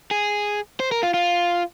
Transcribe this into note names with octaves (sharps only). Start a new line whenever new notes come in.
G#4
C5
A#4
F4
F4